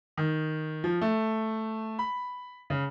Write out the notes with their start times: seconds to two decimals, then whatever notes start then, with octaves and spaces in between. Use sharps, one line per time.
0.18 D#3
0.84 F3
1.01 A3
1.99 B5
2.70 C#3